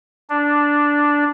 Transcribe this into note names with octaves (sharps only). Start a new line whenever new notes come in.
D4